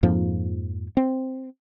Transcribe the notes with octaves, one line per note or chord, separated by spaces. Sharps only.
F2 G#2 F3 A#3
C4